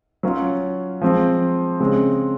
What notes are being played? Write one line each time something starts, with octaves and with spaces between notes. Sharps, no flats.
F#3 C#4 F4
F3 G#3 C4
C#3 G#3 C4